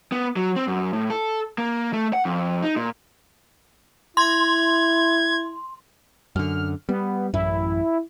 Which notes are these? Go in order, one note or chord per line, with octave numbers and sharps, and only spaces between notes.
B3
F#3
C4
F#2
A2
A4
A#3
A3
F#5
F2
D#4
A#2
E4 C6 G#6
F#2 D3 F6
G3 B3
A1 F#2 E4